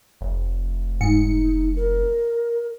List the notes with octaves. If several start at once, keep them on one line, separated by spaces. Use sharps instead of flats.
F1
G#2 D#4 C#7
A#4